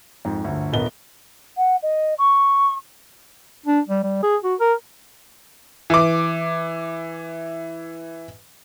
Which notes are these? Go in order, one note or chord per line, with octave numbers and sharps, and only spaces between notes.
F2 G#2
G1 D2
D#1 B3 A#4 D#5 G7
F#5
D#5
C#6
D4
G3
G3
G#4
F#4
A#4
E3 D6